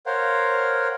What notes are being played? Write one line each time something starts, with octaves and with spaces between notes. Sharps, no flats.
A#4 C5 C#5 F5 F#5